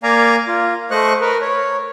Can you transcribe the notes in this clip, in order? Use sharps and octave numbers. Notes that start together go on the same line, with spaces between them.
A#3 D5 F5 G#5 A#5
F4
A3 C5 D#5 C#6 F#6
A#4 B4
C#5